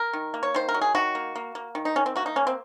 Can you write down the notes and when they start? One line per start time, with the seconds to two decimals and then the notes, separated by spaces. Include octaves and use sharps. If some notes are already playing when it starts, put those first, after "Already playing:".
Already playing: A#4
0.13 D#3
0.34 A#3
0.43 C#5
0.54 D#3 C5
0.69 A#4
0.74 F#3
0.82 G#4
0.95 D#3 F#4
1.15 A#3
1.36 A#3
1.55 A#3
1.75 D#3
1.85 D#4
1.96 D#3 C#4
2.06 C4
2.16 A#3 F#4
2.26 D#4
2.36 A#3 C#4
2.47 C4